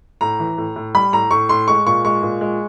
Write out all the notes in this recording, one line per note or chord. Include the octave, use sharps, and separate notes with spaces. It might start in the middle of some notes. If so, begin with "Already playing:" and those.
A2 A#5
E3
A2
A2
G3 B5
A2 A#5
A2 C#6
A2 C6
G#3 C#6
A#2 C#6
G#3 C#6
A#2
G#3